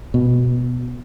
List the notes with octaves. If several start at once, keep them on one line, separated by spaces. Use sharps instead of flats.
B2